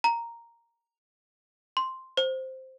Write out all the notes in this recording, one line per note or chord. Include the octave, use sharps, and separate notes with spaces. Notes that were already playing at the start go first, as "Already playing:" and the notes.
A#5
C6
C5